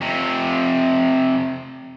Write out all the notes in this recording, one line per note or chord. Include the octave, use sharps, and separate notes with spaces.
F2 C3